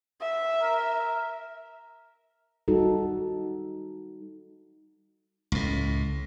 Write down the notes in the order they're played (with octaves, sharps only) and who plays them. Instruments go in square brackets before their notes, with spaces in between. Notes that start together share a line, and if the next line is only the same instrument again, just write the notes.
[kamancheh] E5
[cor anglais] A#4
[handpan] G3 D#4 F#4 A4
[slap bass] C#2 A2